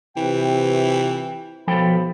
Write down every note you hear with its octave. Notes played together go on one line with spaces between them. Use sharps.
C3 E3 F4 B4 G5
B1 F3 A4 C5 G5 B5